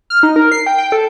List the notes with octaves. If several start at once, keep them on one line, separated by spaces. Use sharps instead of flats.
F6
D#4
A#4
C7
G5
G5
A4